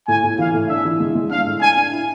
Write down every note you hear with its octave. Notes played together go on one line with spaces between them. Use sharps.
A2 G#5
A2
E3 F5
A2
D4 E5
E3
G#3
G#3
D4 F5
A2
D4 G#5
D4
E4